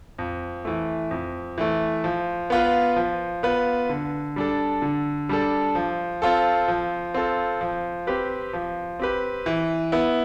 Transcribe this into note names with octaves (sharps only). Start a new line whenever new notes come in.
F2
E3 A3
F2
E3 A3
F3
B3 F4 B4
F3
B3 F4 B4
D3
G3 D4 A4
D3
G3 D4 A4
F3
C4 F4 A4
F3
C4 F4 A4
F3
C4 G4 B4
F3
C4 G4 B4
E3
B3 E4